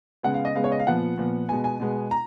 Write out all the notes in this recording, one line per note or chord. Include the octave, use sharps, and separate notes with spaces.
C#3 G#3 B3 F#5
F5
D#5
C#3 G#3 B3 F5
C#5
D#5
F5
A#2 F3 B3 F#5
A#2 F3 B3
B2 G#3 B3 G#5
G#5
B2 G#3 B3
A#5